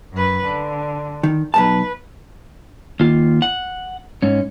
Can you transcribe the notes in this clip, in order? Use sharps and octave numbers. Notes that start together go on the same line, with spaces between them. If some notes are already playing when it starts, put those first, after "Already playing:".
F#2 B4
D3
D#3
B1 F2 B4 A5
D#2 F4
F#5
G#2 C#4